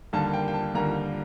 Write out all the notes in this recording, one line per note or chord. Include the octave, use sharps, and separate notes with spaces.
D#2 D3 G3 A#3 A5
G5
G5
A5
D#2 D3 G3 A#3 A#5